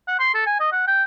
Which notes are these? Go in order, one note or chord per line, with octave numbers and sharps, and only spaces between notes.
F#5
C6
A4
G#5
D#5
F#5
G5